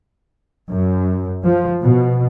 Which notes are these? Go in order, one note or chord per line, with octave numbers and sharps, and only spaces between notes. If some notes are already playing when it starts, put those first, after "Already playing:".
F#2
F3
B2